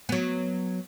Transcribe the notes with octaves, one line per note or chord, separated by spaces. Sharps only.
F#3 B3